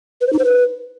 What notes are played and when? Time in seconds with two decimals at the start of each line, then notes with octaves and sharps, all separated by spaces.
0.21 B4
0.27 C5
0.33 D#4
0.39 C5
0.44 B4